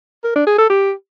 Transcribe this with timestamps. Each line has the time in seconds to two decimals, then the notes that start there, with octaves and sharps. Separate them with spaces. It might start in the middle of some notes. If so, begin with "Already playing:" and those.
0.24 A#4
0.36 D4
0.47 G#4
0.58 A4
0.70 G4